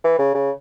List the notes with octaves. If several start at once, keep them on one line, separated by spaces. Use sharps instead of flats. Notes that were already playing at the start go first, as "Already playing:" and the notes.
E3
C#3
C#3